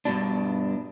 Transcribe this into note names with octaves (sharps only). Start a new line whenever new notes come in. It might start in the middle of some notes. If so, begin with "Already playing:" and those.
G2 B2 D4